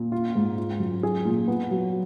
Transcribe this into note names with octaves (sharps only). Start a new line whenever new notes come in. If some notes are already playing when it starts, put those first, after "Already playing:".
Already playing: A#2
F4
G#2
F4
F#2
G#4
A#2
B3
F#3